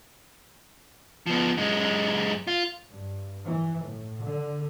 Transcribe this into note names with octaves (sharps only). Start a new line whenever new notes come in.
F3 B3
F#2 G#3
F4
G2
E3
A2
D3